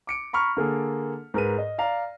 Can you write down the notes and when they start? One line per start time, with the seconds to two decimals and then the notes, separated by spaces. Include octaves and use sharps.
0.07 D6 C#7 D7
0.33 A#5 B5 C#6 F6
0.57 D3 A#3 G#4 A4
1.34 G#2 A#4 B4 D#7
1.58 D#5
1.78 D5 F5 A#5